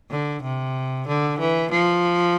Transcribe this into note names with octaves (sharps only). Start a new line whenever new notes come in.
D3
C3
D3
E3
F3